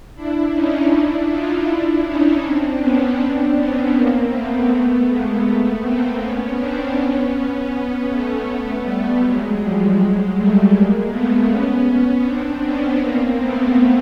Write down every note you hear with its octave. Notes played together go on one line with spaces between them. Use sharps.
D4 E4
C#4 D#4
D4 E4
D#4 F4
D4 E4
C#4 D#4
C4 D4
B3 C#4
C4 D4
B3 C#4
A#3 C4
A3 B3
A3 B3
G#3 A#3
A3 B3
A#3 C4
B3 C#4
C4 D4
B3 C#4
A3 B3
G3 A3
F#3 G#3
F3 G3
F#3 G#3
G3 A3
G#3 A#3
A3 B3
B3 C#4
C4 D4
B3 C#4
A#3 C4
A3 B3